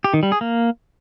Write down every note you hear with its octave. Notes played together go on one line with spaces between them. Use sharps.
G4
D#3
G3
G#4
A#3